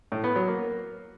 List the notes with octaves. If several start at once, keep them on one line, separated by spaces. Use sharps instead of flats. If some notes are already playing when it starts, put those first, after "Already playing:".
A2
B3
F#3
A#3